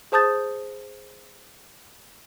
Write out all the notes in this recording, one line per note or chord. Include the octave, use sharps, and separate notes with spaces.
G#4 C5 A5 D#6 G6 A6